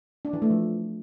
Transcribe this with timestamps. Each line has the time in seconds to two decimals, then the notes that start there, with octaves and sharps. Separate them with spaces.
0.25 D4
0.33 E3
0.42 A3
0.50 F3